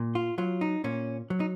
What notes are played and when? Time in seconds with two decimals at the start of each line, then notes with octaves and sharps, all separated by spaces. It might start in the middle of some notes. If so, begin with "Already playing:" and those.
Already playing: A#2
0.15 F4
0.38 F#3 F4
0.61 D#4
0.84 A#2 C#4
1.30 F#3
1.40 D#4